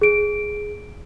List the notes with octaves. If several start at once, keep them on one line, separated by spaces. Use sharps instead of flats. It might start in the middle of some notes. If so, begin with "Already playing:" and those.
G#4 D7